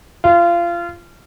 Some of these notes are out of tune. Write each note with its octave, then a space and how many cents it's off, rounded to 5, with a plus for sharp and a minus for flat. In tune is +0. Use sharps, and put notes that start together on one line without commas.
F4 -25